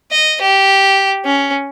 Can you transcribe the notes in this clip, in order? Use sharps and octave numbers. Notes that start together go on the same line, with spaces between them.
D#5
G4
C#4